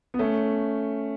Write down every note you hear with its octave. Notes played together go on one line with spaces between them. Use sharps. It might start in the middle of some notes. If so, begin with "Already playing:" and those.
B3
A3 C#4